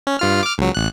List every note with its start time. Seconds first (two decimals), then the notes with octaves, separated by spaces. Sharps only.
0.07 C#4
0.19 G2 F4 F6
0.43 D6 F6
0.58 C#2 F#3
0.74 A1 F#6